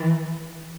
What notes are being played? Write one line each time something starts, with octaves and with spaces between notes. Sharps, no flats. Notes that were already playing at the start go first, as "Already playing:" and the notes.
Already playing: E3